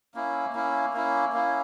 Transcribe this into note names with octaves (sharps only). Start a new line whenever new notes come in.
A#3 C#4 E4
A#3 C#4 E4
A#3 C#4 E4
A#3 C#4 E4